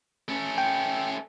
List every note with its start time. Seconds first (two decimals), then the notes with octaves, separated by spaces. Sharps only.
0.29 A3 C#4
0.58 G5